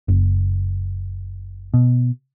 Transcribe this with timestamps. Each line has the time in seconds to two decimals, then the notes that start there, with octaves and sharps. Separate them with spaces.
0.08 F#1
1.74 B2